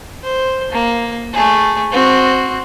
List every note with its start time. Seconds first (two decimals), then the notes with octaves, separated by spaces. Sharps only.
0.23 C5
0.72 A#3
1.33 A3 G#4
1.92 C4 F#4